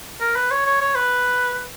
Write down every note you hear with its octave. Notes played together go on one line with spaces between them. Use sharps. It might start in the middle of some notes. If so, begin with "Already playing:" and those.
A#4
B4
C#5
C#5
C#5
B4